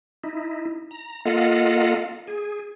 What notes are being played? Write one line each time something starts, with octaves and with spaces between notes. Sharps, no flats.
D#4 E4
A#5
A#3 F4 A4 D#5 F5 F#5
G#4